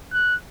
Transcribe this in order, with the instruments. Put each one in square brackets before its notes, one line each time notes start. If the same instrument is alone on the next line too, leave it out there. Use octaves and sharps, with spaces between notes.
[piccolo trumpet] F#6